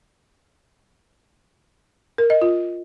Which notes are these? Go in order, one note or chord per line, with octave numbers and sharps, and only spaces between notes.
A#4
D#5
F4